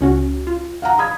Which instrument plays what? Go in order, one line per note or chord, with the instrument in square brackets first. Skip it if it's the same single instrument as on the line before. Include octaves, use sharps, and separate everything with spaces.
[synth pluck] C#2 C#4 F#4
F4
[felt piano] F5 F#5 A#5
B5 D#6 G#6